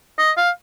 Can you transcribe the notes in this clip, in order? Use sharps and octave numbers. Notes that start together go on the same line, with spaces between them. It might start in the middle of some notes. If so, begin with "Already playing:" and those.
D#5
F5